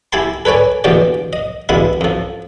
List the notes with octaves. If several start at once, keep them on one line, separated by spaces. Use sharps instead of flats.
E4 G4 G#5 A5 C6
A4 B4 C#5 D5 G#5
A#1 E2 B2 G#3 G4 D5
D#5
E2 G2 B2 G#3 E4 B5
F2 F3